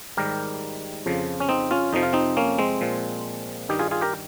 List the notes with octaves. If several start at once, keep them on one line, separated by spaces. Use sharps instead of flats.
G#2 D#3 G3 G4 A#4
F2 C#3 F3
C#4
C4 D#4
C#4 F4
F2 C3 F3 D#4
F4
C4 D#4
A#3 C#4
G#3 C4
A#2 F3
G2 D#3 G3 D#4 G4
F4 G#4
F4 G#4
G4 A#4